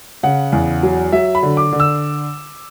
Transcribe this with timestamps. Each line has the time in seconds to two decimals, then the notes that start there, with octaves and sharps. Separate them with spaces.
0.23 C#3 F#5
0.52 E2
0.83 F#3
1.12 F#3 E5
1.35 B5
1.43 D3
1.57 D6
1.72 D3
1.80 E6